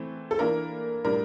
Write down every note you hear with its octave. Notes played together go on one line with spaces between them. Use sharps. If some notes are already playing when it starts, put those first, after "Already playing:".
Already playing: E3 A3 C4
A4
E3 A#3 D4 A#4
A2 G3 D4 A#4